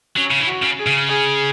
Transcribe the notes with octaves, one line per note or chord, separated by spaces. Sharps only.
F#3 C#4
C#3
E3
F#4
C#3
G#4
C#3
G#4